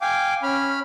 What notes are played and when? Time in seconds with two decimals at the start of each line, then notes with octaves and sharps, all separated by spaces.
0.01 F5 G5 G#5 D6
0.43 C#4 B5 F6